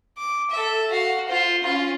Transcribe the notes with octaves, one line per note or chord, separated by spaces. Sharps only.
D6
A4 E5
F#4 F5
F4 C5
C#4 F4